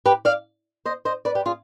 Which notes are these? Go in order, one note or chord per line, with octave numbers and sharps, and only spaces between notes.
G4 B4
D5 F5
C5 D#5
C5 D#5
B4 D5
G4 B4
F4 G#4